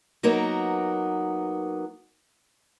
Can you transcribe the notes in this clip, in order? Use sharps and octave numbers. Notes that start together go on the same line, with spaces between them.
F#3 A#3 B3 D#4 A#4